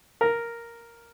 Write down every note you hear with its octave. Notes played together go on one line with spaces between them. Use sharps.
A#4